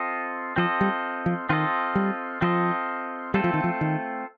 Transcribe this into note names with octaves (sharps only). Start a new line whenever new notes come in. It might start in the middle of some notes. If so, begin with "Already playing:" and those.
Already playing: C4 F4 A4 D#5
F3 C4 F4 A4 D#5
G3
F3
D#3 C4 F4 A4 D#5
G3
F3 C4 F4 A4 D#5
G3 A3 C4 F4 A4
F3
D#3
F3
D#3